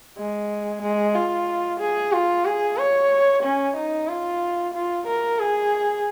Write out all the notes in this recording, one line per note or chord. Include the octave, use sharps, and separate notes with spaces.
G#3
G#3
F4
G#4
F4
G#4
C#5
C#4
D#4
F4
F4
A#4
G#4